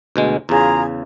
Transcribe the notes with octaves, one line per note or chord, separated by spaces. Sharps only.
D2 B2 G#3
E2 C#3 F4 G#4 A#5